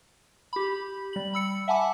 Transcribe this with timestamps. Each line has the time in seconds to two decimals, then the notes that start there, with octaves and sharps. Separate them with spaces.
0.53 G4 B5
1.13 G3 F#7
1.33 B5 E6 C#7
1.68 E5 F#5 G#5 A5 B5 D6